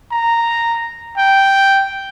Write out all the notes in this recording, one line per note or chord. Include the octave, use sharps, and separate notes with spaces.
A#5
G5